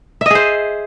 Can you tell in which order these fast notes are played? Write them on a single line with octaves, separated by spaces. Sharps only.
E5 D#5 G#4 C5